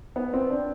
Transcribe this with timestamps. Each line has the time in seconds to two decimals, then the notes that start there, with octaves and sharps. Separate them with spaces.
0.16 B3
0.34 C4
0.50 D4